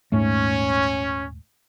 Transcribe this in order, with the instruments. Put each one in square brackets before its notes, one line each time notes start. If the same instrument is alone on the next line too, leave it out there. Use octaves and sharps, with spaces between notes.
[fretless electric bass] D#1 G#2 A3 [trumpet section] C#4